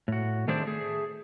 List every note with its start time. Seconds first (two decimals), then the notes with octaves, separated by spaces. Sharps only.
0.08 A2 F#4
0.47 D#3 A3 C4 D4 G#4 C5
0.65 A3 G#4